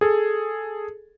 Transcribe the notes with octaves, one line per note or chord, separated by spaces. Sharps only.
G#4 A4